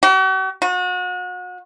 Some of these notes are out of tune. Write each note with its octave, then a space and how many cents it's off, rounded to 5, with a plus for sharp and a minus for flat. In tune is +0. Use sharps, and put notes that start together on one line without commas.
F#4 +45
F#4 -35